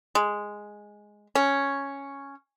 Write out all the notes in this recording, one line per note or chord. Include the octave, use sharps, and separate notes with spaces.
G#3
C#4